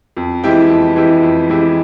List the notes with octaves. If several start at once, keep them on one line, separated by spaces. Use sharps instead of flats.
F2
E3 G#3 E4 G4
F2
E3 G#3 E4 G4
F2
E3 G#3 E4 G4